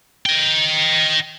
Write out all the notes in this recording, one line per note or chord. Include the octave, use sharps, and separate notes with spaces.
D#5 G5